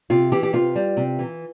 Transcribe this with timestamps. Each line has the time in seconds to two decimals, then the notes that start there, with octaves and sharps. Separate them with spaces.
0.10 C3 F4
0.32 E3 G4
0.43 G4
0.53 C3 F4
0.76 G3
0.97 C3
1.19 E3